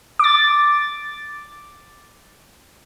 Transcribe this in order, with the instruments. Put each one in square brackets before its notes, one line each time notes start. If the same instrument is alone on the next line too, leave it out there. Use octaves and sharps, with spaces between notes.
[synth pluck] D6 A6